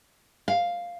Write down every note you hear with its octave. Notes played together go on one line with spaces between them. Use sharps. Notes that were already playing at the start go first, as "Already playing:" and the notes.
F5